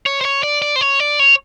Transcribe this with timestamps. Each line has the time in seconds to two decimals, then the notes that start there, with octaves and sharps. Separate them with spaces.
0.06 C#5
0.21 C5
0.25 C#5
0.43 D5
0.62 D5
0.76 C5
0.81 C#5
1.00 D5
1.19 C#5